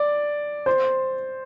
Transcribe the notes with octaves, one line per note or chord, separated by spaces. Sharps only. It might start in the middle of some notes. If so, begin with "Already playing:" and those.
Already playing: D5
C5